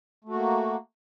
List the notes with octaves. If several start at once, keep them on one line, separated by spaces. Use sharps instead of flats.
A3 A#3 F#4